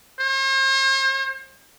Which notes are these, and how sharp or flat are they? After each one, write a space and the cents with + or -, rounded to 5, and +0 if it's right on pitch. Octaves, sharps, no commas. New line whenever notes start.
C5 +45